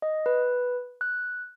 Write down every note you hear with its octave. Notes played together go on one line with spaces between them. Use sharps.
D#5
B4
F#6